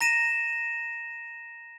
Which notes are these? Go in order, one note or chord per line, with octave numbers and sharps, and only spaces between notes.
A#5 A#6 D#7 E7